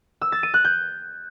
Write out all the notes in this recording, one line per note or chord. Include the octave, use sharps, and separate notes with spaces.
E6
A6
D#7
F#6
G6